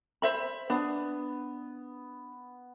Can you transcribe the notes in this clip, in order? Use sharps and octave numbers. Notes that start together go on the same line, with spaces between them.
C5 E5 B5
B3 D4